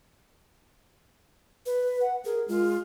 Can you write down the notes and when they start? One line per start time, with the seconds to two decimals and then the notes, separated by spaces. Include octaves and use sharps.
1.66 B4
2.01 F#5
2.25 G#4 A#4
2.48 G#3 F4